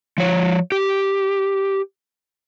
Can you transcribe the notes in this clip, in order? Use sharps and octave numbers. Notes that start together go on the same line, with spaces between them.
F3 C#5
G4